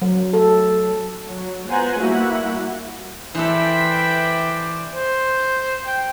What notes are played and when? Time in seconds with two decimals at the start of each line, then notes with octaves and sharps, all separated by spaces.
0.02 F#3
0.33 A4
1.27 F#3
1.68 B3 F4 C5 F#5 G#5 A#5
2.00 G3 A#3 E4 F#4 E5 F#5
3.35 E3 E4 A4 B4 C5 D5 G5 B5
4.94 C5
5.87 G5